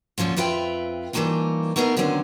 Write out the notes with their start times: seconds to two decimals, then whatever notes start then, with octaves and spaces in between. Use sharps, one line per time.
0.18 D2 A#2 F3 C#4 F4
0.36 F2 C4 F4 B4 E5 G5
1.13 E3 G3 A3 A#3 D#4 F4
1.76 A3 B3 D#4 G#4 A#4 D#5
1.96 D#2 D3 D#3 F#3 C4 C#4